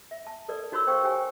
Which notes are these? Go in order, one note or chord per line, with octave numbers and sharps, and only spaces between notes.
E5
A5
A4 A#4 D5
D#4 F#4 C#5 B5 C6 E6
C5 F5 G5 C#6
G4 C#5 G5 G#5